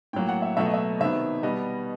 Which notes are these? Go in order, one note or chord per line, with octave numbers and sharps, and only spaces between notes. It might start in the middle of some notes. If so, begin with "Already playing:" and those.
A2 F#3 A#3 G5
F#5
E5
B2 F#3 A3 E5
D#5
E5
C3 D#3 F#3 B3 E5
B2 G3 B3 D#5